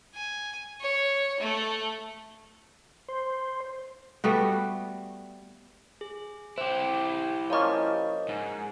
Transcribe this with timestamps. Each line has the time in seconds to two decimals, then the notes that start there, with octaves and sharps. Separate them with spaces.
0.15 G#5
0.81 C#5
1.40 A3
3.09 C5
4.24 G3 A3 B3 F#4
6.01 G#4
6.58 E4 G4 C5
7.50 F3 A#3 C#4 C#5 D#5
8.29 G#2